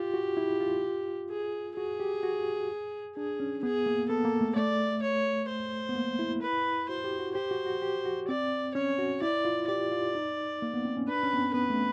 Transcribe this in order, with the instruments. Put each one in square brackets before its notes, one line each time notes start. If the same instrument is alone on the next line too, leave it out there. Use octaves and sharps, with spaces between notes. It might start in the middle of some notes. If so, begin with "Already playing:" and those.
Already playing: [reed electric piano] F4 [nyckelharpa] G4
[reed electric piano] F#4
E4
F4
[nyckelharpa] G#4
[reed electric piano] F#4 [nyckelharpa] G#4
[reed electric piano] G4
F#4
[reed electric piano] D4 [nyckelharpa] G#4
[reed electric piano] C#4
[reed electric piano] B3 [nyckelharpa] G#4
[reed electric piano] A#3
[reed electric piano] B3 [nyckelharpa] A4
[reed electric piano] A#3
A3
[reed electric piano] A3 [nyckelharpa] D5
[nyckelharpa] C#5
C5
[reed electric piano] B3
A#3
E4
[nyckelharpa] B4
[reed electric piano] F#4 [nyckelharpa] C5
[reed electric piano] G4
F#4
[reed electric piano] G4 [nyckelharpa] C5
[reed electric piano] F#4
F#4
G4
F#4
[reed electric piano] C4 [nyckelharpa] D5
[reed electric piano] C#4 [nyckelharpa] C#5
[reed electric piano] F#4
[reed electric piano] E4 [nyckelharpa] D5
[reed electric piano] F4
[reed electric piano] G4 [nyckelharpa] D5
[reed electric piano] F4
D#4
A#3
B3
C4
C#4
[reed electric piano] D4 [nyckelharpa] B4
[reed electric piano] C#4
B3
C4
[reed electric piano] B3 [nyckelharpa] B4
[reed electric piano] A3